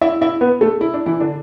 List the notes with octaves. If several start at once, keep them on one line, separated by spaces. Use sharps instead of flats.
E4 E5
E4 E5
B3 B4
A3 A4
E4
D4
E3 E4
D3 D4